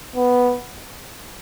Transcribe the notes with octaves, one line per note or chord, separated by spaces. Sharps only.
B3